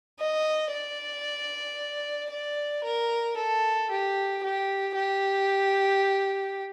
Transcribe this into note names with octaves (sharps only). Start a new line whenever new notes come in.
D#5
D5
D5
A#4
A4
G4
G4
G4